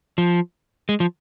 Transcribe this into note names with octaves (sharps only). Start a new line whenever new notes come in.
F3
G#3
F3